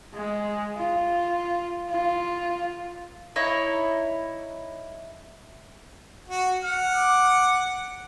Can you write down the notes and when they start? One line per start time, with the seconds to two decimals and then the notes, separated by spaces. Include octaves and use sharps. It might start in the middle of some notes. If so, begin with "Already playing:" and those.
0.14 G#3
0.77 F4
1.89 F4
3.36 D#4 E4 C#5
6.28 F#4
6.63 F#5 F6
6.96 D6